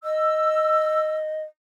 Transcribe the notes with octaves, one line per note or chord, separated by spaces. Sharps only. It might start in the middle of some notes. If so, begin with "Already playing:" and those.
D#5 E6